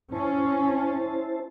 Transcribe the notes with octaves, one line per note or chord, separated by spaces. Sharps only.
C#4 E4 C5 A5